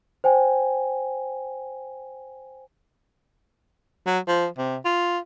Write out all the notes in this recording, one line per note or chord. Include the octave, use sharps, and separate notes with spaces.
C5 G5 G#5
F#3
F3
C3
F4